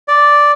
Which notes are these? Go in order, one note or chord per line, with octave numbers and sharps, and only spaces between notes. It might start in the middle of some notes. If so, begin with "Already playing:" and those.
D5